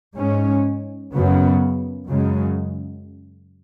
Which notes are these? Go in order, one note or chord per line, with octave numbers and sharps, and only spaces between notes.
G#2 G#3 C#4
F#2 C#3 F#3 B3
F#2 C#3 G#3